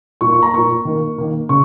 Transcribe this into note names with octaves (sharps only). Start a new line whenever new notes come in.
A#2 A#3 C#6
C#6
A#5
A#2 A#3 C#6
D#3 A#3
D#3 A#3
C#3 C#6